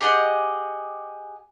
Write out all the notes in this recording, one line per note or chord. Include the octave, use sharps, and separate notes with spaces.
G4 G#4 D#5 F#5